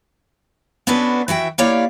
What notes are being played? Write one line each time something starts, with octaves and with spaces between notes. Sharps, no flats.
B3 C#4 D4 F#4 A4 B4
E3 F#4 E5 G5
A#3 E4 G4 C#5 D5 F5